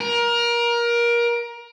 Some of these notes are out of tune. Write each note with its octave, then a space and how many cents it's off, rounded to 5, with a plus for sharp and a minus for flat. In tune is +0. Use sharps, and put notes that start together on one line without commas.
A#4 +25